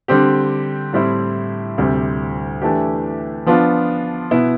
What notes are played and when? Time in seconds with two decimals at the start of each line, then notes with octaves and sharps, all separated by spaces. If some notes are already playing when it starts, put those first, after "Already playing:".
0.08 D3 G3 C4 G4
0.93 A2 G3 C4 E4
1.78 D2 C3 G3
2.61 E3 A3 D4 G4
3.46 F3 B3 D4 F4
4.31 B2 B3 E4